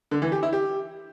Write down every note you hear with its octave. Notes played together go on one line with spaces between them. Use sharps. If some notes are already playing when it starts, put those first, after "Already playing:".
D3
E3
G4
E4
G4